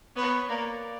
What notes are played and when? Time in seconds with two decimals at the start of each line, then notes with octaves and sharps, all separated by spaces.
0.16 B3 C#5
0.49 A#3 D5